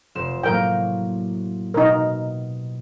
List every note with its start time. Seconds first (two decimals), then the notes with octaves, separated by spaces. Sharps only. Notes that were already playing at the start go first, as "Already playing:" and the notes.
0.15 F1 C5 E7
0.43 A2 F#3 A#3 A#4 G5
1.74 B2 D#4 A#4